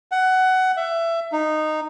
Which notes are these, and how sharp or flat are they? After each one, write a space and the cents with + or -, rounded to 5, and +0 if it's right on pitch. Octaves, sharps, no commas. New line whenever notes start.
F#5 +15
E5 +20
D#4 -10